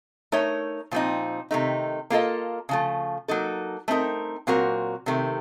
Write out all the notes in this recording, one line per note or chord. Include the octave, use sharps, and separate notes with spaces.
A3 D#4 A#4 C#5
A#2 F3 C4 D#4
C3 D#3 A3 D#4
A#3 F4 A4 D#5
C#3 F3 A3
F#3 A#3 D#4 A4
A3 C4 D#4 A#4
A#2 F#3 C4 F#4 A#4
C3 D#3 A3